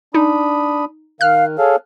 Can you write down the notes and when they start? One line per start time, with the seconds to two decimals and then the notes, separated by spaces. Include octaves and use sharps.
0.14 D4 D#4 B5 D#6
1.21 D#3 F5 F6 F#6
1.58 G#4 A4 C#5 F5